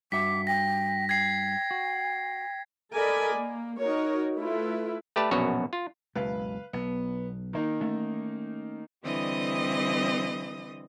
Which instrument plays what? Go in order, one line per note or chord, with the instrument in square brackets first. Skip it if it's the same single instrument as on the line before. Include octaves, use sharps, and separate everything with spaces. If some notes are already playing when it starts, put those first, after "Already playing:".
[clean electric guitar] G2 F#4 E5 [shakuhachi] D6 [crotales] B6
[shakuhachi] G5 [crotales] A#6
[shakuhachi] G5 [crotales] G#6 C7
[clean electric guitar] F#4
[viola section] A4 A#4 D5 D#5 G#5 B5
A#3
D#4 F#4 A#4 C#5
A3 E4 F4 B4
[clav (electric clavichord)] A3 G4 B4 D5 A5
A#1 F#2 B2 F#4 C#5
F4
[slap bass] F#1 C#2 B2 [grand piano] B4 F5 B5
[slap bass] B1 [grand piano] B3
[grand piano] D#3 A#3 D#4
[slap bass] A3 C#4
[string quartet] D3 E3 G3 C4 D#5 D#6